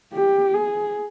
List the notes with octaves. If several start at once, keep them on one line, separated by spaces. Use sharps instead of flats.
G4
G#4